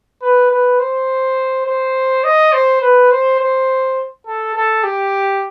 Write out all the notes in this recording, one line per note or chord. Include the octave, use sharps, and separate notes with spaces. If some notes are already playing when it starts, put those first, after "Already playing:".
B4
B4
C5
C5
D#5
C5
B4
C5
C5
A4
A4
G4